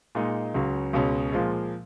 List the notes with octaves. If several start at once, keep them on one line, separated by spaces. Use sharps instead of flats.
A#2 G#3 D#4
C#2 C#3 F#3
C#2 B2 G#3 C#4
A#2 F3 G#3